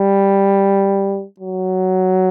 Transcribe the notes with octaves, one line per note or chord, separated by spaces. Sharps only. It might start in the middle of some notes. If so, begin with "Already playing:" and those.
Already playing: G3
F#3